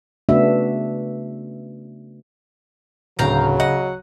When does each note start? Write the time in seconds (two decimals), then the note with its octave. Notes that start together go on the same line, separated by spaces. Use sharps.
0.29 C#3 A3 B3 D4 F#4 E5
3.19 D1 D2 C#3 F#3 F5 G5 A#5
3.60 D#5 F#5